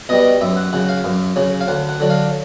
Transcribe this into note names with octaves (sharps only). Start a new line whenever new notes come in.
B2 G3 D#5
F#2 E5
F#5
C#3 F#3 F#5
F5
F#2
C#3 F#3
F5
D2 F#5
F#5
D3 F#3
F5